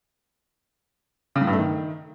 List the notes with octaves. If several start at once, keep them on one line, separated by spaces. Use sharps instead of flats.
C#3
A2
G2
A3
D#3